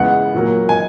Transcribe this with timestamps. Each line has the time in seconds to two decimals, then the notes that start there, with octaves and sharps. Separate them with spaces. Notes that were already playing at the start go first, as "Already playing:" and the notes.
Already playing: E2 C#3 E3 G#3 B3 F#5
0.34 A#2 F#3 A#3
0.69 G#5